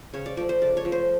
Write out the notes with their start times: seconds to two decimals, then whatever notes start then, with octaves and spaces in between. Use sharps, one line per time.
0.14 C#3 C#5
0.26 D5
0.37 F3 A3 D5
0.49 C5
0.61 C#3 D5
0.77 C#5
0.85 F3 A3
0.92 C5